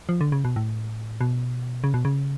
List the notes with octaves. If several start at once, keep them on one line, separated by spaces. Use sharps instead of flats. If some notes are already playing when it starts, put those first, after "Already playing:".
F3
D3
C#3
B2
A2
B2
C#3
B2
C#3